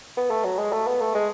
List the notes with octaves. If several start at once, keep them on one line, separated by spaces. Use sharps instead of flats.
B3
A3
F#3
G#3
A3
B3
A3
G#3